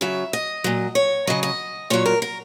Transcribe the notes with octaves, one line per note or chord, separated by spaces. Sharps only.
C#3 F#3 E5
D#5
A#2 F#3
C#5
C#3 F#3 D#5
D#5
A#2 F#3 C#5
A#4
A#4